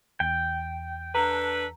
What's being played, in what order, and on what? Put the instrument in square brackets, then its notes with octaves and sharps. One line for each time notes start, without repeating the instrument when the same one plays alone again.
[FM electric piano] E2 [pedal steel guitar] G5
[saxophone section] D4 A4 B4 [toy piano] A#5